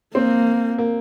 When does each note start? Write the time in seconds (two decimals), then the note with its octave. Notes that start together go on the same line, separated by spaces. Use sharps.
0.15 A#3 C4
0.78 A#3